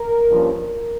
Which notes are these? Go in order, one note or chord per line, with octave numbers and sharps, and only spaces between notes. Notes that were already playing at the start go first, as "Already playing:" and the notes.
Already playing: A#4
G2 F3 A#3 C#4
A#4